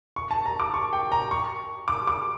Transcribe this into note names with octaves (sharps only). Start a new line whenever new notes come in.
C#6
A5
A#5
D6
C#6
G5
A#5
C#6
D6
D6